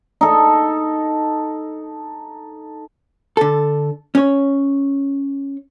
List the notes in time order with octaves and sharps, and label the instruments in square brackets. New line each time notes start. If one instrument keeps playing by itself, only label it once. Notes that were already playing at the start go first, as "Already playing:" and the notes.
[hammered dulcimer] D#4 A4
[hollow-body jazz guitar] D3 A4
C#4 C#5